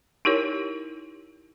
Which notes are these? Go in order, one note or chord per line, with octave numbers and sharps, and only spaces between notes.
D#4 E4 G4 A#4 C#5